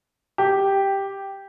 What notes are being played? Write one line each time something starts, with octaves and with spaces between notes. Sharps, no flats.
G4